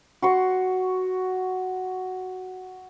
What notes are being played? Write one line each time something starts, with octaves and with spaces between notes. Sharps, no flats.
F#4 C6 C#6